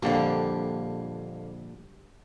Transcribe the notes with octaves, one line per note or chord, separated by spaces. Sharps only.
A#1 F2 D3 G3 A#3 D4